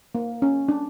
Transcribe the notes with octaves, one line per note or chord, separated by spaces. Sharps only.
A#3
C#4
D4